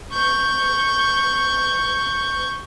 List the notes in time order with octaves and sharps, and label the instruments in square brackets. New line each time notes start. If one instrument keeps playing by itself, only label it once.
[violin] C#6 G6